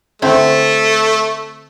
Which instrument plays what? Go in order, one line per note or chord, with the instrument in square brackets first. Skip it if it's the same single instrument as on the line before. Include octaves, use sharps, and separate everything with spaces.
[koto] D3 C4 E4 [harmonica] A3